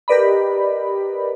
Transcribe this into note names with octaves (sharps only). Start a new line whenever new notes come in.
G4 A#4 B4 D5 D#5 B5